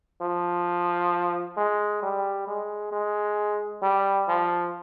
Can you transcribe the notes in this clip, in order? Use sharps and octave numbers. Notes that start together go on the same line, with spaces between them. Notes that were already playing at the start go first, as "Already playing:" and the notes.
F3
G#3
G3
G#3
G#3
G3
F3